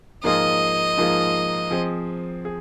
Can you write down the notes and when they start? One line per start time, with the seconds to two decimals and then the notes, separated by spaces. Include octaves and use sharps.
0.24 G#2 F3 A#3 F4 G#4 D#5
0.98 G#2 F3 A#3 F4 G#4
1.71 F3 C4 G#4
2.45 G#4